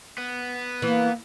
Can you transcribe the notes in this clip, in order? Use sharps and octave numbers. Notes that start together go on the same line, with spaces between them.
B3
E3 A#3